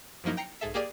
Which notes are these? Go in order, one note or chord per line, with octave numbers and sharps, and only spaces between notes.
F#2 F3 F#3 A#3 D#4 E4
G5 A#5 C7 C#7
B1 G#2 G#4 A4 E5
A#3 G4 G#4 D5 D#7